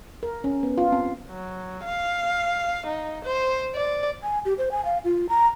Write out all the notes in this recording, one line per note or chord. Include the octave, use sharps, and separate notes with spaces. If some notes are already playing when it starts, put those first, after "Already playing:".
A#4
C#4
B3
F4
C4
F#3
F5
D#4
C5
D5
G#5
G4
C5
G#5
F5
F4
A#5